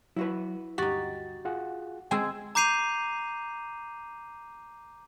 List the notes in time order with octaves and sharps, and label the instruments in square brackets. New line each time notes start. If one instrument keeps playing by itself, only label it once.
[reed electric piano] F#3 [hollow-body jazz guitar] E4 F#4 B4
[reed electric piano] D2 G2 A6 [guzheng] D#4 F#4 [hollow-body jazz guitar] G4
[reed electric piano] F4 G#4 F#5
[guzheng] G#3 C4 G#5 [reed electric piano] G5 E6 G#6
[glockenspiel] A#5 D6 G6 C7 D#7 F7